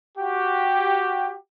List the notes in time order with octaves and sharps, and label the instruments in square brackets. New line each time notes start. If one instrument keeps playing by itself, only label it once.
[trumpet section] F#4 G4